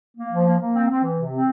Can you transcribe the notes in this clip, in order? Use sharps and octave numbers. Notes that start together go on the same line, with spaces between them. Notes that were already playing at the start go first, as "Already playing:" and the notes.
A#3
F3
A#3
A#3
C4
C4
E3
C3
C4